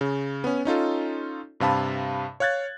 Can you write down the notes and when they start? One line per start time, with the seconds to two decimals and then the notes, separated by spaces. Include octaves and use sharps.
0.01 C#3
0.44 B3 C#4
0.65 C#4 D#4 F4 A4
1.60 G2 C3 F5 A5 B5
2.40 C#5 F5 F#6 G#6 A6